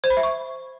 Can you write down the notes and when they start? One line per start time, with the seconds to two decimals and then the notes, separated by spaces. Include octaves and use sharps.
0.04 C5
0.10 B5
0.17 E5
0.23 C#6